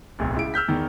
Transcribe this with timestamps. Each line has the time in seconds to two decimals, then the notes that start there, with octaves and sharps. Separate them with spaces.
0.19 D1 B1
0.35 C#2 E4 D7
0.54 E6 F6 G6 B6
0.68 E2 D#3